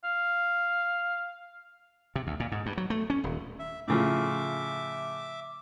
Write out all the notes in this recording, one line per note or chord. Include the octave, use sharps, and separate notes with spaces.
F5
C3
D2
A#2
G#2
G2
F#3
A3
C#4
D#1
E5
A2 C#3 F3 E5 D6